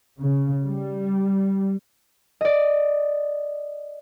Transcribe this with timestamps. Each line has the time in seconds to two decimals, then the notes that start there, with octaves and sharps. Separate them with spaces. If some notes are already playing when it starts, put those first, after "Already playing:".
0.18 C#3
0.63 G3
2.41 D5 D#5